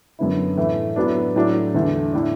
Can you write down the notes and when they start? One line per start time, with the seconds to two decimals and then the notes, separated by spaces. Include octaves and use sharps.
0.19 F#2 D3 B3 E4
0.57 A2 E3 A3
0.96 A2 F#3 B3 D4
1.36 A2 F#3 A3 D4
1.74 E2 D3 A3
2.13 A2 A3 D4